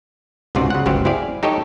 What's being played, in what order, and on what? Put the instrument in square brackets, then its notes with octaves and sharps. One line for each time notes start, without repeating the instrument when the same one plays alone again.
[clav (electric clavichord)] C#2 G#2 C3 F4 F#4 D5
C#3 F#5
G1 C#2 F#3 G4 C5 F5
C4 E4 G4 G#4 D5 F5
D#4 G4 A4 C#5 D#5